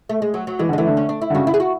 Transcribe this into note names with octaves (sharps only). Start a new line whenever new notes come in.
A3
G#3
F#3
F#3
E3 G#3
D3
G#3
E3 A3
D3
C#4
D4
E4
D3
C#3 F#4
E4
G#4
F#4